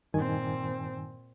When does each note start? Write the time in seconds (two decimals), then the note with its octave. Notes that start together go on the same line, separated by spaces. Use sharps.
0.14 G2 A#2 D#3 C4 G#5